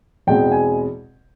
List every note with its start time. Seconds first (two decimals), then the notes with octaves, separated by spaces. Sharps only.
0.27 E2 B2 G#3 C4 G5
0.52 G#5